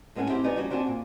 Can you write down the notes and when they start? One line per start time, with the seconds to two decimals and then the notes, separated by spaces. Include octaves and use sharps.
0.15 A2 G#3 B3 C#4 F#5 G#5
0.30 C4 E4 G4
0.43 D2 B3 D#4 D5 G#5
0.57 G3 C#4 F#4
0.71 C4 D4 E4 F#4 D5 G#5
0.87 A#2